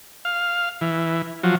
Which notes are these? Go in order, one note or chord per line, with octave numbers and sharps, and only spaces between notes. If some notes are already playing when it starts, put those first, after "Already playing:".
F5
E3
F3 F#3